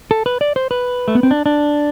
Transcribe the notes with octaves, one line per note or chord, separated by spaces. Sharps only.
A4
B4
D5
C5
B4
A3
B3
C4
D4
D4